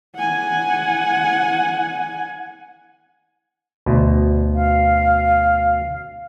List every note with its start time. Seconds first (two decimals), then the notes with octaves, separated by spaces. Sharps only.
0.15 F#5 G#5
3.86 D2 B2
4.55 F5